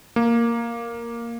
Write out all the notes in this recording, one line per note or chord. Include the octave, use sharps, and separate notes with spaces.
A#3